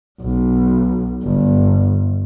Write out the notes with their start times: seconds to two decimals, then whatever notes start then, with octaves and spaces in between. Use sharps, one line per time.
0.21 B1
1.23 G1